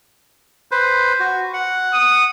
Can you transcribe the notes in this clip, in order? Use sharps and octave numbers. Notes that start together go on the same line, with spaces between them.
B4 C5
F#4
F#5
D#6